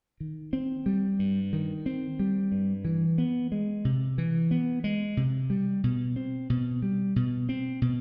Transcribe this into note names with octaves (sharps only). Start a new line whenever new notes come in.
D#3
C4
G3
G2
D#3
C4
G3
G2
E3
B3
G#3
C3
E3
B3
G#3
C3
G3
B2
C4
B2
G3
B2
C4
B2